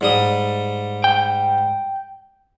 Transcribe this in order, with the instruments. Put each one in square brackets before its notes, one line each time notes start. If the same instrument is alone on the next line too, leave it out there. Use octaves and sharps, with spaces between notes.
[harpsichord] G#2 G3 D#6
[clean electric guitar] G5